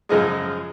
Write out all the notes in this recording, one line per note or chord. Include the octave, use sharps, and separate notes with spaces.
F#2 C#3 F3 G#3 D#5